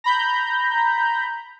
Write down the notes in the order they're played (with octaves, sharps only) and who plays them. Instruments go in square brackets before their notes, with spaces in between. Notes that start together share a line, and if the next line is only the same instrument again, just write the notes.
[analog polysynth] A#5 B5 G6